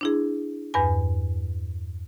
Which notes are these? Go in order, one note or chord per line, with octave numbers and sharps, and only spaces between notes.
D4 E4 G#4
E2 G2 B4 G#5